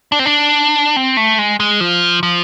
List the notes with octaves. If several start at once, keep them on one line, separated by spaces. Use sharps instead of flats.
D4
C4
D4
C4
A3
G#3
G#3
F3
F3